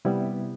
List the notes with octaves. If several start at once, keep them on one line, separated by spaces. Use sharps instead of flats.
C3 G3 B3 E4